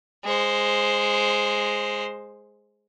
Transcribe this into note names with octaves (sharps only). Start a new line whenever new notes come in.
G#3 C5